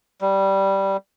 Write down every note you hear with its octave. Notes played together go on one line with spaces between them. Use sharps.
G3